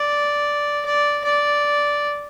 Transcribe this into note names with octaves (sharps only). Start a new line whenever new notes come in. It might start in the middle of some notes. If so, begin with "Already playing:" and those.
Already playing: D5
D5
D5